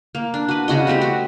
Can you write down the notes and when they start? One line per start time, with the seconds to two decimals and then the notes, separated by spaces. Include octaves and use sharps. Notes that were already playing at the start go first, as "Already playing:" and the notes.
0.15 A#3
0.34 D4
0.48 F#4 B4
0.68 C#3 F#4 D#5
0.87 G3 A3 C4 G4
1.01 F#4